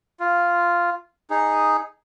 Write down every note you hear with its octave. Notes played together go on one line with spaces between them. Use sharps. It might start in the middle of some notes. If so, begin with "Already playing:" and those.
F4
D#4 G#4